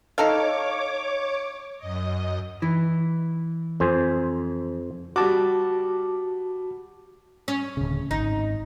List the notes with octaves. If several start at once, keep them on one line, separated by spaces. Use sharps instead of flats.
D#4 A4 C#5 F5 D6
F#2 D#5
E3
F2 C5 G#5
G3 F#4 A5 D6
C#4
D1 C#3
G#1 D#4